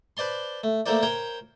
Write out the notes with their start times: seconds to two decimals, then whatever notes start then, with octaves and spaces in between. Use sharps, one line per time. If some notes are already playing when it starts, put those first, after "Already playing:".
0.17 B4 C5 D5 A5 C6
0.64 A3
0.86 A3 A#3 A4 A#4 C5 D5
1.03 A#4 C5 C#5 G5 A#5